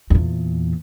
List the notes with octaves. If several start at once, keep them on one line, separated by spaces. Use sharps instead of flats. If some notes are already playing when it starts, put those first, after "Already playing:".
E2 A#2